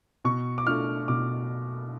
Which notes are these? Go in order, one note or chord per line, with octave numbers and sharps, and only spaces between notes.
B2 C#6
D6
A3 D4 F4 F6
B2 D6